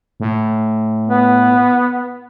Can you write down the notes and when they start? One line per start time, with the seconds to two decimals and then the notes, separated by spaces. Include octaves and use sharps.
0.20 A2
1.07 B3